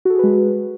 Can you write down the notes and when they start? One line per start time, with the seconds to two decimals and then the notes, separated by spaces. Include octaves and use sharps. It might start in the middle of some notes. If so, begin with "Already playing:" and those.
0.05 F#4
0.10 A4
0.14 G#4
0.19 B4
0.23 G#3